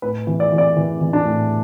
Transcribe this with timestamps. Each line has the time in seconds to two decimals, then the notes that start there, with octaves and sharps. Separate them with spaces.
0.02 A2 B4
0.27 E3
0.40 D5
0.52 E3
0.58 D5
0.77 E3
1.01 E3
1.13 D4
1.25 A2